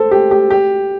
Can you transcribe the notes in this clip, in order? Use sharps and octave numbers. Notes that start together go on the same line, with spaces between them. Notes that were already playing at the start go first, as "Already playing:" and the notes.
Already playing: A4 C5
G4
G4
G4